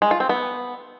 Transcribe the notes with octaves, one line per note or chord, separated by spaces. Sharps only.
G#3
F4
C4
B3